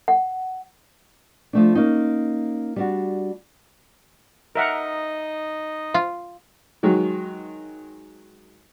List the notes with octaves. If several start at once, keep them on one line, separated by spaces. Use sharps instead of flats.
F#5
F3 A3 D4
A#3 C#4 D#4
G3 D4 F#4
D#4 A#4 D#5 E5 F#5
F4
D#3 F#3 G#3